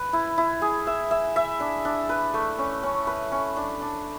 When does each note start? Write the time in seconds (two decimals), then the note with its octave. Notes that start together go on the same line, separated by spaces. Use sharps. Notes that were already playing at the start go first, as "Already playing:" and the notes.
Already playing: B4
0.13 E4
0.38 E4
0.62 G#4
0.87 E5
1.11 E5
1.36 E5
1.60 D4
1.85 D4
2.09 B4
2.34 A3
2.58 C#4
2.83 C#4
3.07 B4
3.32 C#4
3.56 D4
3.81 D4